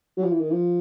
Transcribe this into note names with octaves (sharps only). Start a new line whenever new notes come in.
F#3
F3
E3
D#3
E3
F3